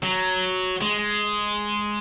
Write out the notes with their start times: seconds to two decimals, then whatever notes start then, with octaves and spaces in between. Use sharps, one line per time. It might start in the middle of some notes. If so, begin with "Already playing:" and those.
0.03 F#3
0.82 G#3